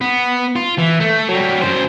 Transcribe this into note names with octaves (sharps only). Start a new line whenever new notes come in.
B3
F4
E3
A3
F#3 G3
F#2 C5